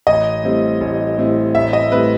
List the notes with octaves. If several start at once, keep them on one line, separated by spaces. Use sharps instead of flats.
A1 D#5
A2 G3 C4 E4
A1
A2 G3 C4 E4
A1 E5
D#5
A2 G3 C4 E4 B4